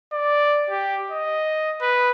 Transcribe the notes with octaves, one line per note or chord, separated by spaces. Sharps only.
D5
G4
D#5
B4